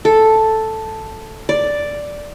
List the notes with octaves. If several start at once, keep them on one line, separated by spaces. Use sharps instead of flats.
A4
D5